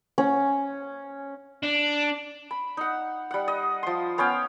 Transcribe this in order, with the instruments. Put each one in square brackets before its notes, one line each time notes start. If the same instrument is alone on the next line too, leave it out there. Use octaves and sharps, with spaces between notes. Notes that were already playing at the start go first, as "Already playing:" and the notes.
[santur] C#4
[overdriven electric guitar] D4
[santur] B5
D#4 F#5
G3 F#5
D#5
F3 C6
B3 C#4 F5 G5